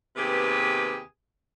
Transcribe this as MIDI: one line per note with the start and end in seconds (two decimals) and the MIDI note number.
0.16 1.00 39
0.16 1.00 48
0.16 1.00 59
0.16 1.00 67
0.16 1.00 68
0.16 1.00 71